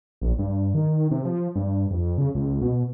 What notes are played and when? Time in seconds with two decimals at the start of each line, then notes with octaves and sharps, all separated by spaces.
0.21 A#1
0.39 G2
0.74 D#3
1.11 C3
1.25 F3
1.56 G2
1.91 F2
2.18 C#3
2.35 C#2
2.61 B2